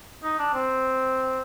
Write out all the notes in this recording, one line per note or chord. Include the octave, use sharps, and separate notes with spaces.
D#4
D4
C4